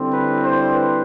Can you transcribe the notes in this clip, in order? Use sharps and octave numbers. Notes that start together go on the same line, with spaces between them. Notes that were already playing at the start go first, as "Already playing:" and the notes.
Already playing: D3 G3 C4 E4
B4
C5
B4